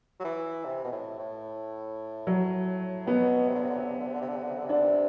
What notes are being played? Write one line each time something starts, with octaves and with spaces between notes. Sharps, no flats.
F#3
E3
C3
B2
A2
A2
F#3
B2 B3
C3
D3
C3
D3
C3
D3
C3
D3
C3
D3
C3
D3
C3
D3
C3
D3
C3
D3 D4
C3